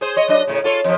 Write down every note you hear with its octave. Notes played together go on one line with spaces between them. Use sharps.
G#4 C5
C#5 D#5
F#3 D4 D#5
A2 C#3
F4 A4 C#5
F2 F3